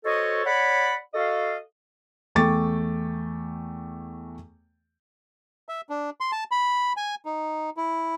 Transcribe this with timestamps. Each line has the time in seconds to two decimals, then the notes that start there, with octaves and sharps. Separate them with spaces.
0.04 F#4 A4 C5 C#5 D#5
0.45 C#5 D5 F#5 B5
1.14 F#4 A4 D#5 F5
2.35 E2 A3 G5 C#6 D6 A6
5.69 E5
5.89 D4
6.20 C6
6.32 A5
6.51 B5
6.97 G#5
7.25 D#4
7.77 E4